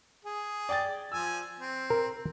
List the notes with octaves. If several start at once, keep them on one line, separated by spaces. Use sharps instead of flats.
G#4
D5 G5 A6
F3 G#5 E6
C4
A#4